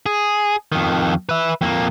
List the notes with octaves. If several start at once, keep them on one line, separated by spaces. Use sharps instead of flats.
G#4
F2 D#3
B4 E5
F2 A#3